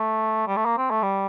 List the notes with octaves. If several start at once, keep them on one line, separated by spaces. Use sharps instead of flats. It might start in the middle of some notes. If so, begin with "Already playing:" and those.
Already playing: A3
G3
A3
A#3
C4
A3
G3